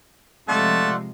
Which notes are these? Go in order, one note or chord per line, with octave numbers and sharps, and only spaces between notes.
C3 F3 G#3 A3 F4 A4 D5 F#5